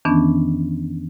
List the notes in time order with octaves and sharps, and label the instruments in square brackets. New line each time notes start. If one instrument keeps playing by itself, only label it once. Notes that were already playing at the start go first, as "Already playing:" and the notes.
[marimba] F2 D#3 E3 B3 C#4 D4